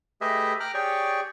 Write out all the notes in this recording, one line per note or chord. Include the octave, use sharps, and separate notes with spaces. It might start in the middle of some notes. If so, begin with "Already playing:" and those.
A3 G4 G#4 B4 D#5 E5
G5 A#5 D6 F6 F#6
G4 G#4 C#5 D5 G5 C#6